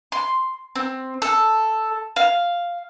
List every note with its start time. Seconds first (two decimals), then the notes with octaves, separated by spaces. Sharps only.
0.12 C6
0.76 C4
1.22 A4
2.16 F5